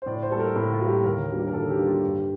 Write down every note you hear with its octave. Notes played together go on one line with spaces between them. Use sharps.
C5
A2 D5
C5
G3 A#3 A4 A#4
A2 A4
F4
G3 A#3
G4
D#2 A#4
D3 G3 A#3
A#4
D#2 A4
G4
D3 G3 A#3
F4
G2 G4